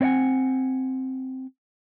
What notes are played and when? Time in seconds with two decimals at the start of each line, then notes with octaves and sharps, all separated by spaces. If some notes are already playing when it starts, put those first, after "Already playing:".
0.01 C4 C#5 D#5 F#5 G#5